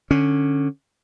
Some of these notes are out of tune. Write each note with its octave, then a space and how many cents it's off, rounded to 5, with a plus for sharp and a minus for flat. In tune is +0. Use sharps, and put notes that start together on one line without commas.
D3 +15 C#4 +0